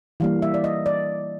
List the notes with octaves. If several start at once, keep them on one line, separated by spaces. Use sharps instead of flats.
E3 G3 A#3 F5
E5
D5
D#5
D5